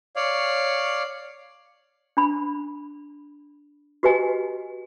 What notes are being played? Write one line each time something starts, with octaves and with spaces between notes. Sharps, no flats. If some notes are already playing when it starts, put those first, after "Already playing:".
C#5 D5 F5
D4 B5
F#4 G4 B4 D#5 G#5